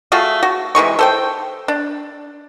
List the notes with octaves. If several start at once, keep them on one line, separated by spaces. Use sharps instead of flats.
A3 F4 F#4 G#4
F#4
C3 E3 G#3 C#6
A4 C5 G5
D4